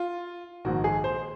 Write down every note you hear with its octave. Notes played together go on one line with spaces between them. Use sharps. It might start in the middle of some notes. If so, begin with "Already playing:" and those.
Already playing: F4
A#1 G#2 D#3 F#4
G#4
C5